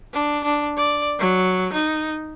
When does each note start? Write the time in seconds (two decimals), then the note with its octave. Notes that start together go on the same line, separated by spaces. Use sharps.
0.13 D4
0.44 D4
0.77 D5
1.19 F#3
1.73 D#4